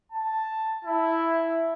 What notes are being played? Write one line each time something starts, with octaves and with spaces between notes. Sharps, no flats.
A5
E4